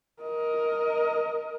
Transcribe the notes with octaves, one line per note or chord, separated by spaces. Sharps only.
A#4 D#5